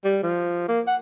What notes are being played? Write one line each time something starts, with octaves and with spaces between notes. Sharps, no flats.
G3
F3
A#3
F#5